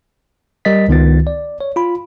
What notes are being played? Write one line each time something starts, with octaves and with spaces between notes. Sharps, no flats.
G3 A#4 D#5 A6 B6
C#2 D#3 B3 F4 A6
D5
C#5
F4 B5